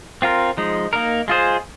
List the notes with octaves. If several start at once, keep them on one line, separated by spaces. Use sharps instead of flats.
C4 F4 A#4
F3 G#3 D#4
A#3 D#4 A#4
G#3 F4 G#4 C5